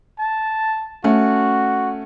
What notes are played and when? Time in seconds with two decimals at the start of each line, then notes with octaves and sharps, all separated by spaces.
0.19 A5
1.04 A3 C#4 F#4